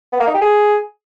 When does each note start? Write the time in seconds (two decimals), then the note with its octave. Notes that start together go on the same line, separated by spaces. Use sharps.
0.13 B3
0.20 A#3
0.27 D#4
0.34 G4
0.41 G#4